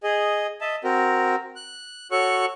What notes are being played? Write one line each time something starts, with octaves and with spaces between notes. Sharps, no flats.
G#4 D#5
D#5 E5 A5
C4 F#4 A#4
F#6
F#4 A4 C#5 C#6 F#6